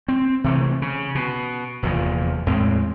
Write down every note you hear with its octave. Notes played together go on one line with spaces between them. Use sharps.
C4
C3 E3 A3
C#3
B2
F1 E2 A#2 F3
E2 A2 G#3 C4